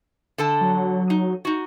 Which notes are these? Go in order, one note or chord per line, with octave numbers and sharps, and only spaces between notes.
D3 A4 A5
F#3
D#4
D#4 F#4